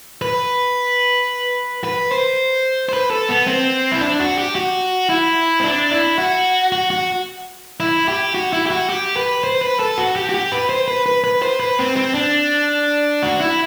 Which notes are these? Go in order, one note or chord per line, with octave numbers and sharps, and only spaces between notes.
B4
B4
C5
C5
B4
A4
B3
C4
E4
D4
F#4
G4
F#4
E4
C4
D4
E4
F#4
F#4
F#4
E4
G4
F#4
E4
G4
F#4
G4
B4
C5
B4
A4
F#4
G4
F#4
G4
B4
C5
B4
B4
B4
C5
B4
C4
C4
D4
F#4
E4